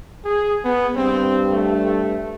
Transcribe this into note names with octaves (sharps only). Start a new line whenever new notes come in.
G#4
B3
G2 C4
A3